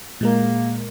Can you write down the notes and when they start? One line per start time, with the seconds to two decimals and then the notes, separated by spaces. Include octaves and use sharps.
0.21 A#2 G#3 A#3 A#4